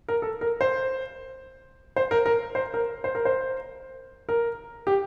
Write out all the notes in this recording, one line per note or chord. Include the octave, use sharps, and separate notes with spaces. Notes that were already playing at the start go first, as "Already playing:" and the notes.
A#4
A4
A#4
C5
C5
A#4
A#4
C5
A#4
C5
A#4
C5
A#4
G4